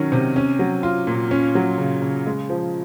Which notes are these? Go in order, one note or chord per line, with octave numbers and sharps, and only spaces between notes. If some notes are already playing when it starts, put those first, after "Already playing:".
Already playing: D#3 F#3 C#4
C3
C#4
F#3
F4
A#2
C#4
F#3
C#3
C#3
G#3
F3